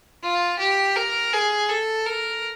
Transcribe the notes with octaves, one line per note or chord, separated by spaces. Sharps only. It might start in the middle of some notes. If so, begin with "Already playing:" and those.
F4
G4
A#4
G#4
A4
A#4